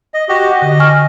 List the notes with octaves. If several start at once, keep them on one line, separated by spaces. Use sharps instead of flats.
D#5
F#4 G4 D#5
D3 D#5
G#5 C#6 F6